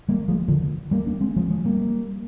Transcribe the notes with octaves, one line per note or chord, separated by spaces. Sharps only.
G3 A#3
F3 G#3
D3 F3
G3 A#3
A#3 D4
G#3 C4
F3 G#3
F3 G#3
G3 A#3